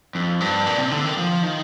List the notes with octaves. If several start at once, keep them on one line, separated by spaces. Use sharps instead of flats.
F2
G2
A#2
C3
D3
D#3
F3
D#3